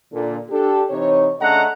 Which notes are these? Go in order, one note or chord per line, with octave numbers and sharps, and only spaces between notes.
A#2 D3
D4 G4 A4
C3 E3 D#4 C#5
C#3 A3 D4 D#5 F#5 A#5